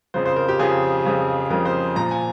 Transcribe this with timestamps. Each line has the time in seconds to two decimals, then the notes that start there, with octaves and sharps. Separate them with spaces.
0.14 F2 C#3 F3 C5
0.26 C5
0.36 A#4
0.49 G4
0.59 F2 C#3 F3 G#4
1.05 F2 C#3 F3
1.50 F2 C#3 F3 A#4
1.65 C5
1.96 A#2 F3 A#5
2.11 G#5